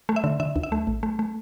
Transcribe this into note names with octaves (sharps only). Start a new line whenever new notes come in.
A3
E5
D3
D3 E5
D2
E5
A3
A1
A3
A3